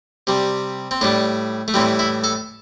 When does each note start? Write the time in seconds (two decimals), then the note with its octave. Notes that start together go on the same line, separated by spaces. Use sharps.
0.27 C3 G3
0.91 C4
1.01 A2 G3 D4
1.68 A3
1.74 A2 E3 G3 C4
1.99 E4
2.24 A4